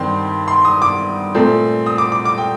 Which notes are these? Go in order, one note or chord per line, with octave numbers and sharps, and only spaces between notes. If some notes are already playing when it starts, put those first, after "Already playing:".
Already playing: G2 D#3 G3 C4 C6
C6
D#6
D6
A#2 A3 C4
D#6
D6
D6
D6
G5